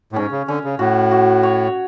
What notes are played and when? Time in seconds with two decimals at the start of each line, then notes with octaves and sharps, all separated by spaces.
0.12 A2
0.15 G#2 C#4
0.31 C#3
0.48 D3 C#4
0.64 C#3
0.79 A2 F#4
1.11 F#4
1.43 C#5